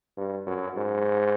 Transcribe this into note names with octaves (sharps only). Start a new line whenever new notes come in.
G2
F#2
G#2